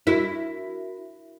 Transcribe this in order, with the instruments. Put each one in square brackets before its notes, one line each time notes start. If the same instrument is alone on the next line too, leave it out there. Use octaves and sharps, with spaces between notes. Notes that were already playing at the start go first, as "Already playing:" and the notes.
[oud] E4 [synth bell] F#4 A#4